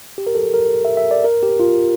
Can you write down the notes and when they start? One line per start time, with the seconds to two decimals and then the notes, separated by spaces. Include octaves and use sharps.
0.18 G4
0.27 A#4
0.35 A4
0.54 A#4
0.85 E5
0.97 E5
1.11 D5
1.25 A#4
1.43 G4
1.60 F4